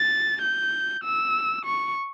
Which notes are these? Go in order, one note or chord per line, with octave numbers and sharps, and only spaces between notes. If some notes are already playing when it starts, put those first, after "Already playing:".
Already playing: A6
G6
E6
C#6